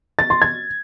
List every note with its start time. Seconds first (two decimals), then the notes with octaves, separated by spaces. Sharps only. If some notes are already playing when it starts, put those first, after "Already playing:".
0.19 A6
0.30 C6
0.42 G#6